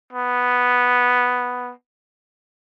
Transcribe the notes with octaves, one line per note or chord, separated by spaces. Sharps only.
B3